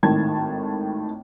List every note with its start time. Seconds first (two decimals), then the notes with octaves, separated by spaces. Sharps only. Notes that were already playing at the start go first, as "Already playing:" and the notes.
0.03 G#1 A2 D#3 A3 A5 G#6